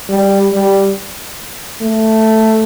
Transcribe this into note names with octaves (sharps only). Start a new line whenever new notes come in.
G3
G3
A3